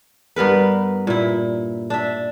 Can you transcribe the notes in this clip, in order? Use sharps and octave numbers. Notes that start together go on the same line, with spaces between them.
G2 B3 A#4 B4
A#2 E4
D4 E5